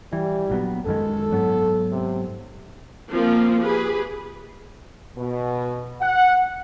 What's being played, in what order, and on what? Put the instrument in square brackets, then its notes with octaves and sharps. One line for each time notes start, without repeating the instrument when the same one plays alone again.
[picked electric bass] E3 [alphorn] G3
[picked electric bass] A#1 F#3 B3
[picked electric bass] F#2 D#3 G#3 [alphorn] A4
[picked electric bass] G#2 F#3 B3
[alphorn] C3
[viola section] F3 A#3 C4 F4
G4 G#4 B4
[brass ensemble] B2
F#5